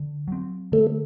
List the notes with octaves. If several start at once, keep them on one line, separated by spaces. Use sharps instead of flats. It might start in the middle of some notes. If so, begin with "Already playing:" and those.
Already playing: D3
F#3 C4
D3 A3